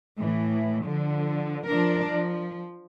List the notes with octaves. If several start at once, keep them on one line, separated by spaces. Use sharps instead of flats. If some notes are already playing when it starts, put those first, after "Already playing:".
A2 E3
D3 F3
F3 D4 A#4
F3